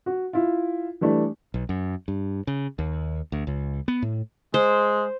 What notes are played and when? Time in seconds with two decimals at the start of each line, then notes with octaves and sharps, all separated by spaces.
0.06 F#4
0.33 E4 F4
1.01 E3 G3 A3 D4
1.54 B1
1.69 F#2
2.08 G2
2.47 C#3
2.79 D#2
3.32 D2
3.47 C#2
3.88 B3
4.02 A2
4.54 G#3 C5